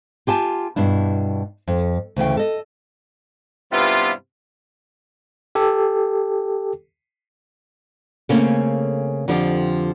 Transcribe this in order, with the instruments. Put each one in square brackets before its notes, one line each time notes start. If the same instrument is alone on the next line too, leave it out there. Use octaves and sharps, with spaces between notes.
[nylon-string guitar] F4 G4 G#5 A5
G2 B2 D4 E4
F2
D2 C#3 E3 G5
A4 D#5
[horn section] G2 C3 B3 E4 F4
[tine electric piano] G4 A4
[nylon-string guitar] C#3 A3 A#3 C4 C#4
F2 D3 F3 G4